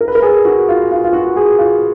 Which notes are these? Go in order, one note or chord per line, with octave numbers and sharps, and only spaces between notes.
A#4
B4
A#4
G#4
F#4
F4
F4
F4
F#4
G#4
F4